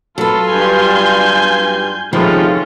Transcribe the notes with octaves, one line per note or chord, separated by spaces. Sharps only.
F#3 F4 A4 B4 C6
G2 G#5 G6
G#2 C3 D#3 F3 A3 C#4 F4 B4